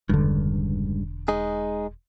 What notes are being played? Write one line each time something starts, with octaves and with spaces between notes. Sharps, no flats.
E1 C#2 G2 D3
G#3 D#4 G#4